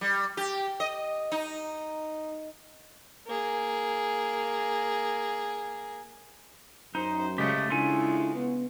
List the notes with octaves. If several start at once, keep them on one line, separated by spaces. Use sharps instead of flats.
G3
G4
D#5
D#4
A#3 G#4
F#2 D#4 C5
C#3 G#3 A3 G4 D#5
C#3 G#3 D4 E4 F4 A4 G#5
B3